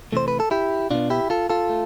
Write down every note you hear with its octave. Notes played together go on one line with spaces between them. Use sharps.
C3 E3 A3 C5
B4
A4
E4 G4
B2 B3 D4 F4
E4 G4
F4 A4
F4 A4
A3